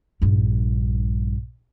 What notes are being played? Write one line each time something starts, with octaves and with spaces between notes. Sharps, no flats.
A#1 G2